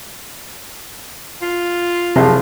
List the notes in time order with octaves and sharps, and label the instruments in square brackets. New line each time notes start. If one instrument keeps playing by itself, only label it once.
[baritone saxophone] F4
[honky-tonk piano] F#1 F3 [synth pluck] C3